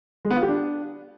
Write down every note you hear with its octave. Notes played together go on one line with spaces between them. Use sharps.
G#3
B3
F4
G4
D4